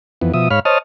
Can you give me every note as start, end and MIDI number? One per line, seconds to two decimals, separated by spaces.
0.22 0.32 41
0.22 0.32 52
0.22 0.32 59
0.34 0.49 47
0.34 0.49 53
0.34 0.49 76
0.34 0.49 87
0.51 0.60 44
0.51 0.60 73
0.51 0.60 77
0.51 0.60 83
0.51 0.60 89
0.65 0.78 72
0.65 0.78 73
0.65 0.78 75
0.65 0.78 81
0.65 0.78 87
0.65 0.78 89